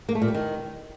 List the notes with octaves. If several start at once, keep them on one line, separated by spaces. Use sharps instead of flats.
A#3
A3
A#2
G3
D#3